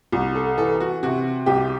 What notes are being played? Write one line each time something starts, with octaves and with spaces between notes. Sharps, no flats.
C2
A4
E3 A4
F#4
C3 F#4
C2 G4